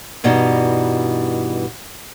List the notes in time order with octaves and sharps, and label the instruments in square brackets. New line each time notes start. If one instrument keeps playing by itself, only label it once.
[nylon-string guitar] G2 B2 E3 G3 D#4